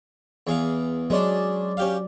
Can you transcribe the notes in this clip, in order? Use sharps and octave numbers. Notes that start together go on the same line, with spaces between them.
E2 G#4 F5
F#3 G#3 C#4 D4 C#5 D5
C#4 G4 F5